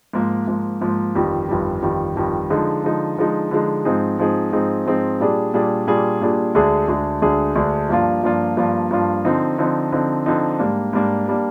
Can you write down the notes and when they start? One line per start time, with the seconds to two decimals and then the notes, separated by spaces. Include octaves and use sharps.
0.13 G#2 F3 A#3
0.48 G#2 F3 A#3
0.81 G#2 F3 A#3
1.15 G1 F2 D#3 G3
1.49 G1 F2 D#3 G3
1.83 G1 F2 D#3 G3
2.16 G1 F2 D#3 G3
2.50 D3 F3 G#3 D#4
2.84 D3 F3 G#3 D#4
3.17 D3 F3 G#3 D#4
3.51 D3 F3 G#3 D#4
3.85 G#2 F3 C4 D#4 G#4
4.18 G#2 F3 C4 D#4 G#4
4.53 G#2 F3 C4 D#4 G#4
4.86 G#2 F3 C4 D#4 G#4
5.20 A#2 G3 D4 G#4
5.54 A#2 G3 D4 G#4
5.87 A#2 G3 D4 G#4
6.21 A#2 G3 D4 G#4
6.55 D2 D3 G#3 D4 G#4
6.88 D2 D3 G#3 D4 G#4
7.22 D2 D3 G#3 D4 G#4
7.56 D2 D3 G#3 D4 G#4
7.89 G2 F3 A#3 D4 F4
8.23 G2 F3 A#3 D4 F4
8.57 G2 F3 A#3 D4 F4
8.91 G2 F3 A#3 D4 F4
9.25 D3 F3 C4 D#4
9.58 D3 F3 C4 D#4
9.92 D3 F3 C4 D#4
10.26 D3 F3 C4 D#4
10.59 G#2 G3 A#3 D4
10.93 G#2 G3 A#3 D4
11.28 G3 A#3 D4